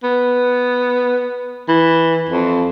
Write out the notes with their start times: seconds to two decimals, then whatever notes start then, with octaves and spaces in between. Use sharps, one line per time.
0.03 B3
1.68 E3
2.30 F2